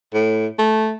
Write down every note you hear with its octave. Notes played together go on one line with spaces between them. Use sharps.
A2
A3